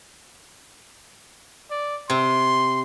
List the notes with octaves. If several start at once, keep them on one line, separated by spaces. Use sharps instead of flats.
D5
C3 C6